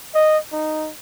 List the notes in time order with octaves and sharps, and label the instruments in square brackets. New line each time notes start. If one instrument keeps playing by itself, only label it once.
[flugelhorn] D#5
D#4